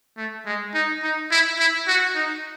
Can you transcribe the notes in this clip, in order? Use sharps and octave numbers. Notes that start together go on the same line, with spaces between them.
A3
G#3
D#4
D#4
E4
E4
F#4
D#4